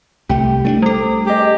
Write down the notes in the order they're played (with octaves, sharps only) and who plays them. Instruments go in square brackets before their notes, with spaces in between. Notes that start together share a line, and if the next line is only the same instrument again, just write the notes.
[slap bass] C2 A3 [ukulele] G4
[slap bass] A3 C4 D4
[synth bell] G3 A4
[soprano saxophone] G4 [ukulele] G#4 D#5